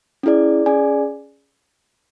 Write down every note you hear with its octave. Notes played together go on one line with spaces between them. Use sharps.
C#4 E4 G#4 D5
C#4 G#4 D5 G#5